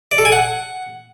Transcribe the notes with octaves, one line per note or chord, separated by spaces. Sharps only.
D5
A4
G#5
F#5